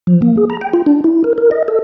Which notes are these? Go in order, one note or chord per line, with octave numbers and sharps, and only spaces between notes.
F3
A#3
G#4
A#5
G5
F4
D4
E4
A#4
A#4
D#5
A4